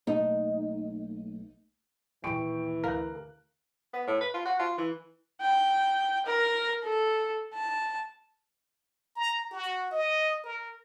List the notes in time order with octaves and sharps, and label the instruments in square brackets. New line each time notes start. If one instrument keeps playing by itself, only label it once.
[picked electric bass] B1 A3 A#3 [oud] D#4
[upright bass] D#2 A#2 [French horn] E3 [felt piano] G5 C#6 D7
[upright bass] D2 [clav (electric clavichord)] A#4 [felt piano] F5 F#6
[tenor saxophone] B3
A2
B4
F4
F#4
F4
E3
[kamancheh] G5
A#4
A4
A5
[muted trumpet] A#5
F#4
D#5
A#4